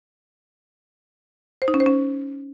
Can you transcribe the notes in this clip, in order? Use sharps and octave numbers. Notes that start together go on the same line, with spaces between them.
C5
D#4
C#4
C5
C#4